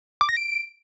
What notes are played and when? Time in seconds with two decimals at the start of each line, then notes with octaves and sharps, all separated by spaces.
0.21 D6
0.29 A#6
0.36 D7